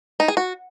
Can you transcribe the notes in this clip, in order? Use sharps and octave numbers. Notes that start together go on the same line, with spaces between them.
D#4
G#4
F#4